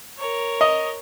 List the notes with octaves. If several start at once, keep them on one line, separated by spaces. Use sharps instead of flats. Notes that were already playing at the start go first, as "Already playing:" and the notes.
A#4 C#5
D#5